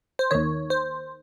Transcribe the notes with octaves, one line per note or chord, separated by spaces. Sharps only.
C5
D#2 D#3 C#5
C5